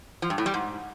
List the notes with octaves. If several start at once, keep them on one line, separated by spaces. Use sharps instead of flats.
F3
G2
A2
G3
G#2